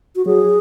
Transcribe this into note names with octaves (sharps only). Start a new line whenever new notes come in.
F#4
F#3 G#4